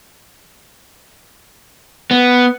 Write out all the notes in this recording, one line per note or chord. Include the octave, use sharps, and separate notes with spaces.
B3